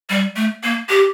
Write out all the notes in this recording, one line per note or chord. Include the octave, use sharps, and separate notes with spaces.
G3
A3
A#3
G4